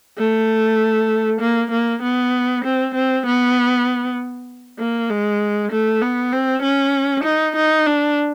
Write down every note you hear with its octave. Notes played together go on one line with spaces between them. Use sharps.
A3
A#3
A#3
B3
C4
C4
B3
A#3
G#3
A3
B3
C4
C#4
D#4
D#4
D4